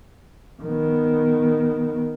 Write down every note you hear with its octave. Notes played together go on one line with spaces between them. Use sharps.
D#3 B3